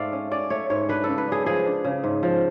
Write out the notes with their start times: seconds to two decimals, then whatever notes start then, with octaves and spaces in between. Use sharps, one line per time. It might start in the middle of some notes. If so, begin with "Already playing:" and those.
Already playing: G#2 A3 D5 F5
0.12 C#4
0.31 C#4 D5
0.50 A3 C#5
0.70 G#2 C#5
0.89 D4 B4
1.04 C#3 A4
1.18 B4
1.28 D4 G#4
1.46 F3 G#4
1.66 D4
1.84 C#3
2.04 G#2
2.23 F3